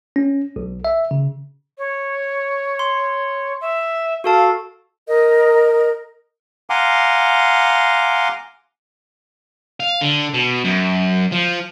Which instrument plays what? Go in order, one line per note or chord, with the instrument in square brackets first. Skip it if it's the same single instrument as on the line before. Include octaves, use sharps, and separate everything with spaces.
[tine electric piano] C#4
B1
E5
C#3
[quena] C#5
[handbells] C6
[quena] E5
[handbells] F#4 A4 A5 [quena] F5
[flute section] A#4 D#5
[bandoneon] F5 F#5 G#5 A#5 C6 D6
[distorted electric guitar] F5
D3
B2
F#2
F3